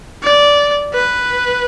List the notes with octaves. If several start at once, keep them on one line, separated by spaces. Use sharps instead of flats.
D5
B4